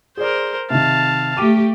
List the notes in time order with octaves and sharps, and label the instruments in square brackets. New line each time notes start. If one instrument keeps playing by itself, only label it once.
[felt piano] G#4 D5 [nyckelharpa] A#4 C5
[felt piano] C3 D#3 [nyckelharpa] F5 A5
[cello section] A3 G4 [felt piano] D6 D#7